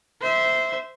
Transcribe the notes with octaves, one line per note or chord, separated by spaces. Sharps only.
C5 E5